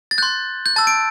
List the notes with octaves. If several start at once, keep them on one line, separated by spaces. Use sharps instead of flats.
A6
C6 F#6 G6
G6
A5 E6 G6 A6
D7